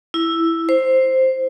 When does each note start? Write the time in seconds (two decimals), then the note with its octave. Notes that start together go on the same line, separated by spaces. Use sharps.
0.14 E4
0.69 C5